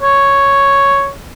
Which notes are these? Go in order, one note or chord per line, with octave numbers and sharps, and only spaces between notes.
C#5